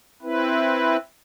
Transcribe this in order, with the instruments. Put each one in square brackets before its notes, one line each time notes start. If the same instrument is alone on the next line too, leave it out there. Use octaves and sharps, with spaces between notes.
[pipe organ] C4 E4 B4